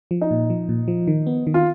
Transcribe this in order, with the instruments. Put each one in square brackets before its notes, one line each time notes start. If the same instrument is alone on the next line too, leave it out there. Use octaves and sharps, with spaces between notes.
[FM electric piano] F3
[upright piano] D#4
[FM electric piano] A#2
F3
A#2
F3
D#3
B3
D#3
[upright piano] F4